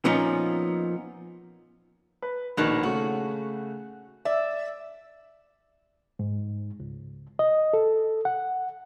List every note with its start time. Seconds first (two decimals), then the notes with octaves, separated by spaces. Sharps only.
0.05 A#2 F3 B3 C#4 D#4
2.22 B4
2.57 A#1 B2 D#3 G#3 F#6
2.83 C#3 A3 F#4
4.25 D5 E5
6.19 G#2
6.80 C#2
7.39 D#5
7.73 A4
8.25 F#5